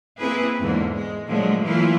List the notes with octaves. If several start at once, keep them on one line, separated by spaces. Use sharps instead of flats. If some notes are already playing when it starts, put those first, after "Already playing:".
A#3 C4 E4 G#4 B4
E2 G#2 D3 A#3
G#3
A#2 D3 F3 F#3 G#3 A3
E3 F#3 A3 A#3 E4 F4